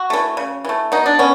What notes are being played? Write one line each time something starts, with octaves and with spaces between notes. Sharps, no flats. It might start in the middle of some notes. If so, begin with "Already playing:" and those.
Already playing: F#4
E3 A3
C#3
E3 A3
B2 D#4
D4
B3 C#4